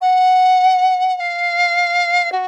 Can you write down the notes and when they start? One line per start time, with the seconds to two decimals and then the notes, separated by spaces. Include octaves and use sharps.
0.01 F#5
1.16 F#5
1.20 F5
2.32 F#4